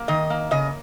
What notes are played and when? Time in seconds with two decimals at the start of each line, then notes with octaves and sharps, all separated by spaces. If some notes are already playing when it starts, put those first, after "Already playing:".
Already playing: A#3
0.08 D#3 D#5
0.30 A#3
0.51 C#3 D#5